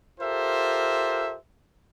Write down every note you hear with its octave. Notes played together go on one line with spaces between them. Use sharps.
F4 G4 A4 A#4 C5 E5